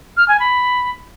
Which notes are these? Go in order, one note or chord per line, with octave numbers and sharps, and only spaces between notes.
F6
G#5
B5